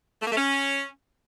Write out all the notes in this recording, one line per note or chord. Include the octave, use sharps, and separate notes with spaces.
A3
A#3
A3
C#4